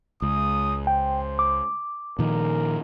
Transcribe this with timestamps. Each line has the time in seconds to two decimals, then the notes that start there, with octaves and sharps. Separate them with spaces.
0.22 C#2 D#6
0.87 C5 G5
1.39 D6
2.19 A#2 D#3 F3 A#4